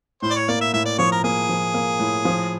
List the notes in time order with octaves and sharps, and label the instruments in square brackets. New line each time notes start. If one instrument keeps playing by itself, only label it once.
[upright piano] A2 [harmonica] C5
[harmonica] D5
C#5
[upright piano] A#3 [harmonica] D5
[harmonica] E5
[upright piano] A2 [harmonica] E5
[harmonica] D5
[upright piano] F3 [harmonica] C#5
[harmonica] A#4
[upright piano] A#3 [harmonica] G#4
[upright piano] F3
A#3
A2
F3